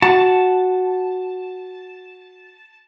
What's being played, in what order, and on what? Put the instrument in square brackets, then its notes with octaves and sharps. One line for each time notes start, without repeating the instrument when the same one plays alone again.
[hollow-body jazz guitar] F#4 [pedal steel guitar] A5